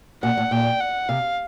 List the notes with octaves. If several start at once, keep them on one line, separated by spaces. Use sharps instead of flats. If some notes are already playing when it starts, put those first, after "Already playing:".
A#2 F#5
A2
A#2 G5
F#5
C3 F5